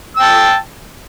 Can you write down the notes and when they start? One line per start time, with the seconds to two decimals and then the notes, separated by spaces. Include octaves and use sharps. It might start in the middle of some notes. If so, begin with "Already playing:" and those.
0.17 E6
0.19 G5
0.22 A5